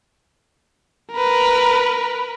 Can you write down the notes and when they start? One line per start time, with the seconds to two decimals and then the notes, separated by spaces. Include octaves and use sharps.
1.14 A#4 B4